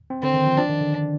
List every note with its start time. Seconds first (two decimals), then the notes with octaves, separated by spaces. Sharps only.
0.10 C4
0.23 D3 C4
0.34 D#3
0.46 F3
0.58 F3 D4
0.70 D#3
0.81 D3